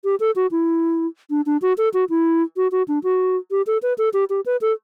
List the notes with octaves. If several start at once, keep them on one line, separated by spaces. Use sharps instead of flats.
G4
A4
F#4
E4
D4
D4
F#4
A4
F#4
E4
F#4
F#4
D4
F#4
G4
A4
B4
A4
G4
G4
B4
A4